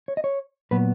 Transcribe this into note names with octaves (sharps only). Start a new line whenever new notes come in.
C#5
D#5
C#5
A#2 F#3 B3 B4